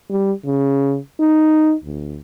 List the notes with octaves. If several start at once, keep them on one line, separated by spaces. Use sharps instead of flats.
G3
C#3
D#4
D2